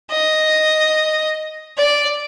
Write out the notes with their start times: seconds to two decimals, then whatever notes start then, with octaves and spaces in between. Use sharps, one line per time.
0.11 D#5
1.78 D5